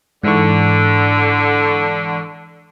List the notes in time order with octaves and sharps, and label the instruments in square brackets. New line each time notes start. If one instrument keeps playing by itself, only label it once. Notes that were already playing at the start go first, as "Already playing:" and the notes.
[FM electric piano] G#2 E3 C#6 [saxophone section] D3